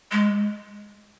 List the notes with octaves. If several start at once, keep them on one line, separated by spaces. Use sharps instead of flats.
G#3